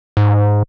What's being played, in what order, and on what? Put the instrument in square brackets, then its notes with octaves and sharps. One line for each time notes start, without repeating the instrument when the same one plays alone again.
[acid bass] G#2